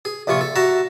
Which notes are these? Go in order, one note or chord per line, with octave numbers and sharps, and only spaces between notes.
G#4
A#1 C3 F3 F4 C#6
A4
F#4 E5 A5 A#5